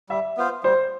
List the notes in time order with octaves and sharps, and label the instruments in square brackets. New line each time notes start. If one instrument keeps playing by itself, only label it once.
[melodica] G3 [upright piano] E5
[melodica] B3 F4 C5
[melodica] G3 [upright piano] C5